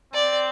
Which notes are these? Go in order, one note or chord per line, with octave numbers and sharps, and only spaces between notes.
C4 D5